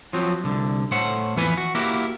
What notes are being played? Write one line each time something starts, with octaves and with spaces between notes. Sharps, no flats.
F3 F#3 C4
C2 D3
A2 A3 C5 F#5
F2 E3 B3 B4 G#5
F#4
A#3 E4 F#4 G4